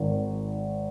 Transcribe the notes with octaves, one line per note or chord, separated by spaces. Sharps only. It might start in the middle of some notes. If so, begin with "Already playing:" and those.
Already playing: G#1 D#3